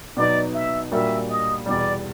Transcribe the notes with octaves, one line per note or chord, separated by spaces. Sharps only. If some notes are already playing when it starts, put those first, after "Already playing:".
B2 F#3 B3 D#4 D5
E5
A#2 G3 A#3 D4 F#4 E5
D#5
E2 B2 G3 D5